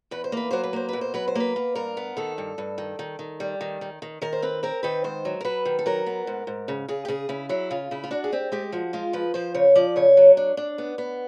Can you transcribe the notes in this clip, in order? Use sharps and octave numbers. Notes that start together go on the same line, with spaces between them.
E2 B4
C5
A#3 B4
F#3 C5
B4
A#3 C5
B2 B4
C5
F#3 B4
C5
A#3 B4
A#3
G2 A#4
B3
D#3 A4
G2
G2
D#3
D#3
D#3
G3
D#3
D#3
D#3
D#3 A#4
C5
C4 B4
C4 A#4
D#3 B4
G#2 C5
F#3
A#4
F#3 B4
D#3
A4
F#3 A#4
B3
G#2
G#2
C#3
C#3 G#4
G4
C#3 G#4
C#3 E4
F#3 E4
C#3 F4
C#3 E4
F4
D4 F#4
G#4
C4 G4
G#3 G4
F3 F#4
G#3 F4
F3 B4
F3 C5
C#3 C#5
F3 D5
C#3 C#5
F#3
D4
D4
B3
B3